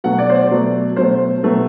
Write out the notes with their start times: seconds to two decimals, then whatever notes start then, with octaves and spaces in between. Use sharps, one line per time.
0.04 B2 F#3 A3 F#5
0.19 D5
0.30 C5
0.35 D5
0.50 B2 F#3 A3
0.96 B2 F#3 A3 C5
1.43 B2 F#3 A3